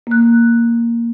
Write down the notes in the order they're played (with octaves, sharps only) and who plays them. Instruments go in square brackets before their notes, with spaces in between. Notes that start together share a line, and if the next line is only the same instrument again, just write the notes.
[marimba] A#3 F#6